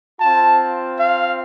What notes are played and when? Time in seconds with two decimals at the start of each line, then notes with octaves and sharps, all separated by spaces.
0.20 C4 F4 A5
0.99 F5